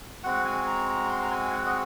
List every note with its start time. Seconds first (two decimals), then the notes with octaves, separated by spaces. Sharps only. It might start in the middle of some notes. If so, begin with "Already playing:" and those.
0.24 G#3 C4 F#4 F#5
0.45 G#5
0.67 A#5
0.88 A#5
1.10 C6
1.22 A#5
1.31 G#5
1.52 F#5
1.66 D#5